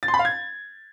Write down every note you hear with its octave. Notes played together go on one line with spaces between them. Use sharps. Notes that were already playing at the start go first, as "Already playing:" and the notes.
A6
C6
B5
F5
G#6